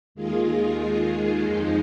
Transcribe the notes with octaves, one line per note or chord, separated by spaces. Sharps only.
D#2 D#3 G#3 F4 G#4
F2 F3 G#3 D#4